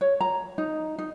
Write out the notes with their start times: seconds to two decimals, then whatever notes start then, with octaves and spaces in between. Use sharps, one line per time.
0.01 C#5
0.21 A#5
0.58 D#4
0.98 D#4